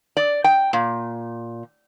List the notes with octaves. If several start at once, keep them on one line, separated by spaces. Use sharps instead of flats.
D5
G5
A#2